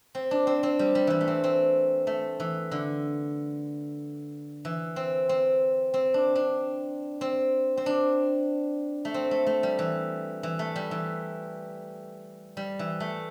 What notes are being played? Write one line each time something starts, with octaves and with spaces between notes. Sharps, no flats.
C4
D4
C4
C4
G3
G3
E3 G3
A3
C4
C4
A3
E3
D3
E3
C4
C4
C4
D4
D4
C4
C4
D4
A3
C4
A3
A3
G3
E3
E3
A3
G3
E3
G3
E3
A3